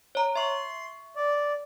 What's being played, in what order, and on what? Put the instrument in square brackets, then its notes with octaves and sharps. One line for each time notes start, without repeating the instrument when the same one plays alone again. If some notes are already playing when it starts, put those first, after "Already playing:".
[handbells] C#5 A#5
[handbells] E5 C#6 [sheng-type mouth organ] C6
[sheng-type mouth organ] D5